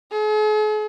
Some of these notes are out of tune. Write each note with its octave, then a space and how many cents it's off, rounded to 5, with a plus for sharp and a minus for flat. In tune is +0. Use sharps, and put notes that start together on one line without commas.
G#4 +45